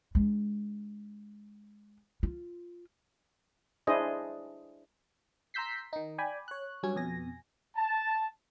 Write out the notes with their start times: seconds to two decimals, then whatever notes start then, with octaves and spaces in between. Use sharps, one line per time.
0.15 G#3 D4
2.23 F4
3.87 D4 E4 G#4 C5 D#5
5.54 A#5 C6 E6 G6 B6 C7
5.93 D#3 D#4
6.18 D5 G5 G#5 B5
6.48 C#5 F#6
6.83 G2 F#3 C#4 G#6
6.96 F2 B2 G#5 A#6
7.76 A5